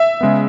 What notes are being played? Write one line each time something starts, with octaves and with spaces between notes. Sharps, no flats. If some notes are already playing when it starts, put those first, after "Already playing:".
Already playing: E5
C#3 G#3 B3